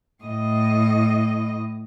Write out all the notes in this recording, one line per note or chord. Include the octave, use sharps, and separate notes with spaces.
A2 D#5